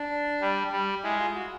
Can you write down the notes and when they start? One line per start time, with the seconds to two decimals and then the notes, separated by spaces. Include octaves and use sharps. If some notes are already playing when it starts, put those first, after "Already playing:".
Already playing: D4
0.41 G3
0.72 G3
1.04 G#3 E4
1.20 F4
1.36 F#4